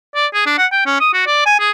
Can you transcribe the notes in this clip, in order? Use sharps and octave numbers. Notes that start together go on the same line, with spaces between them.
D5
G#4
D4
F#5
G5
C#4
D#6
F#4
D5
G#5
G#4